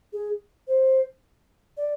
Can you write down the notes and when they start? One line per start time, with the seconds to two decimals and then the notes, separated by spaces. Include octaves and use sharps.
0.13 G#4
0.67 C5
1.77 D5